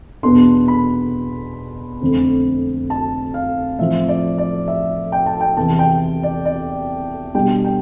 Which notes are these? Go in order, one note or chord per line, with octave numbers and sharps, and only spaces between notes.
E2 B2 B3 D4 C6
B5
F2 D3 A3 C4
A5
F5
A2 F3 C4 E5
D5
D5
E5
G5
A5
G5
E2 C3 E3 B3 A5
G5
D5
D5
B2 G3 D4 G5
G5